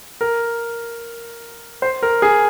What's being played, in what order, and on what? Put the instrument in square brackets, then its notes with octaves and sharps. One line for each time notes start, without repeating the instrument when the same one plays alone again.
[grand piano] A#4
C5
A#4
G#4